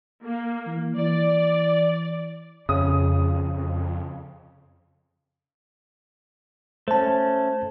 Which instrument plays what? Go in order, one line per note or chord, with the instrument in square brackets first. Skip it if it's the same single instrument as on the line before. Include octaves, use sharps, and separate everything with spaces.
[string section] A#3
[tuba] E3
[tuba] E3 [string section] D5
[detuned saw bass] F2 [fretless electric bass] C#3 [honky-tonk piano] D#6
[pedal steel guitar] A3 C#4 [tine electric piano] C5 A5